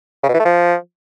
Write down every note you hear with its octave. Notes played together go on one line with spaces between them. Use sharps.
C#3
B2
E3
A3
F3